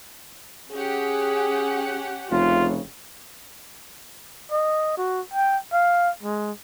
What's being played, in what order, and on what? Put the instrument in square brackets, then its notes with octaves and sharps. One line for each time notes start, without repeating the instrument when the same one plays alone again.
[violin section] C#4 G4 F#5 [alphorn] G#4
[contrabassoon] F1 [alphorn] C#3 [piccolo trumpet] F4
[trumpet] D#5
F#4
G5
F5
G#3